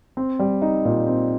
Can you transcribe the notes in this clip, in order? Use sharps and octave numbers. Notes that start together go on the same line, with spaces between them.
C4
G3
D#4
A#2
C4